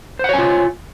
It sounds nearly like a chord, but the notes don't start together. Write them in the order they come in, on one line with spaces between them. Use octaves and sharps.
C5 F#5 C#5 G#5 F4